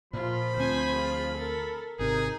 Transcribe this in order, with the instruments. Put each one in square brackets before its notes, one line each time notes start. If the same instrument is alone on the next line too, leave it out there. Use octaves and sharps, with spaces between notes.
[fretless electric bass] A#2 [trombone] F3 [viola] F4 [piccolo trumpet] B5
[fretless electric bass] D2 C4 [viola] C5 G#5
[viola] F4 G#4
A4 A#4
[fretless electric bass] G#1 C3 [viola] D#4 [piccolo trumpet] G#4 [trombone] A#4